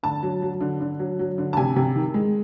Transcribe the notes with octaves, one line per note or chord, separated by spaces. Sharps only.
D3 A5
F#3
F#3
D3
D3
F#3
F#3
D3
A5
C3 G#5
C3
D#3
G#3